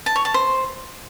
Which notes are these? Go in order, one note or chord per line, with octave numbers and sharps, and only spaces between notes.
A5
C#5
A5
C5